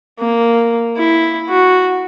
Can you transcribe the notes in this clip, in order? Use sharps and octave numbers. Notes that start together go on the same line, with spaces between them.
A#3
E4
F#4